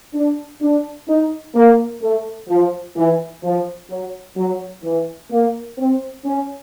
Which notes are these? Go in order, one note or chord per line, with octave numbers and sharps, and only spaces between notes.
D4
D4
D#4
A#3
A3
F3
E3
F3
F#3
F#3
E3
A#3
C4
C#4